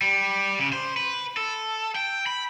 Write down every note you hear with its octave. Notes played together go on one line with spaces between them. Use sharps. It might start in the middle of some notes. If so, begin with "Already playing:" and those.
G3
C#3
C5
B4
A4
G5
B5